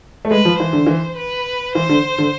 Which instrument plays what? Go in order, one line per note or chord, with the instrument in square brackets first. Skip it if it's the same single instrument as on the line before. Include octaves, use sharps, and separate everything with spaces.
[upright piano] A3
[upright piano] G#3 [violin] B4
[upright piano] F3
[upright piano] E3 [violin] C5
[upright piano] D3
E3
[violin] B4
[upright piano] E3 [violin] C5
[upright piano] D3
D3